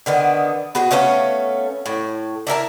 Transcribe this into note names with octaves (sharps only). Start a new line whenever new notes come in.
D3 D#3 B3
B3 F#4 G#4
A3 B3 C#4 F5
A2
D4 E4 A#4 A5